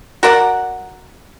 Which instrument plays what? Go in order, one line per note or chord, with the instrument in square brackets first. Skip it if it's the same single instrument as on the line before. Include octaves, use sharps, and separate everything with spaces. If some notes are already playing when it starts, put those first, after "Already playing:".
[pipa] F#4 A#4 D5 F#5